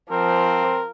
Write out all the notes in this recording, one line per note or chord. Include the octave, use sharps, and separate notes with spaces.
F3 C4 A#4